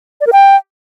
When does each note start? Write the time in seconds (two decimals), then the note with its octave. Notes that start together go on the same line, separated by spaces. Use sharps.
0.21 D5
0.27 A#4
0.33 G5